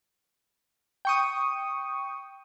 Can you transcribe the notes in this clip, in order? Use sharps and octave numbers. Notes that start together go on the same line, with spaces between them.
G5 C#6 D#6